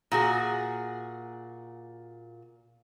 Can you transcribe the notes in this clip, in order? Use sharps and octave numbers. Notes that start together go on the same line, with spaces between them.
A#2 F#4 G#4